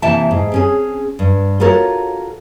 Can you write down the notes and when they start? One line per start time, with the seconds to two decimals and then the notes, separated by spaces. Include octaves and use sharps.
0.02 C3 E3 A#3 E5 G5 A5
0.31 G#2
0.52 C4 C#4 G#4
1.19 G2
1.60 F4 F#4 A4 A#4 C#5